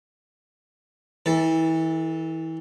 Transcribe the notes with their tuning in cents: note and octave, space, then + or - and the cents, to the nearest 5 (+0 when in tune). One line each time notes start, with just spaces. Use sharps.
E3 -30 A4 +0